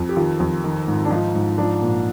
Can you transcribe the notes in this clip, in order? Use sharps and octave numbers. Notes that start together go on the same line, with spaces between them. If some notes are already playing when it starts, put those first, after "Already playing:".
Already playing: F2
G4
D#3 F4
F2
D#3
G#2
D4
F3 D#4
G#2
F3 D4
A#2